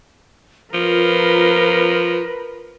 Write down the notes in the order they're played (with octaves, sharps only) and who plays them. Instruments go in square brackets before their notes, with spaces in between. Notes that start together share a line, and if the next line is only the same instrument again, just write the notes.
[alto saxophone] F3 [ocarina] F4 [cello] A#4 B4